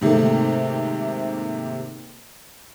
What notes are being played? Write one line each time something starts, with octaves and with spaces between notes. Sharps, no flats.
G#2 C3 D#3 A3 A#3